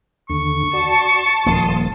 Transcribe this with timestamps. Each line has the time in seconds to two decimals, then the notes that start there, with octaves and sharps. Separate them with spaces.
0.30 D#2 D3 C#6
0.73 F#4 D5 A5
1.46 D#1 F3 A#3 C6 D#6